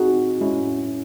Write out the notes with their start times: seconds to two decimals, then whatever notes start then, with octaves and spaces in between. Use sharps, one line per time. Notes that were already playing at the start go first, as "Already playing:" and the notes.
Already playing: C4 D#4 F#4 G#4
0.41 G#3 C#4 E4